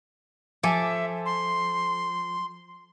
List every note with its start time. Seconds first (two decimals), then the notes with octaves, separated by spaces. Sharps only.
0.63 F3 A4 E5 G#5 D6
1.26 C6